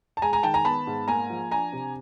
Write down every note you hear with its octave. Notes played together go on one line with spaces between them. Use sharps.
A5
G#3 G#5 A#5
G#5 A#5
D#3 G5 A5
G#5 A#5
B3 A5 B5
G#2
A#3 G#5 A#5
F3
D4 G#5 A#5
C3